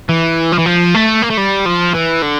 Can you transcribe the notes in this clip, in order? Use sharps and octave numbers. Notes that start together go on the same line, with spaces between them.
E3
F3
E3
F3
A3
A#3
A3
G3
F3
E3
D3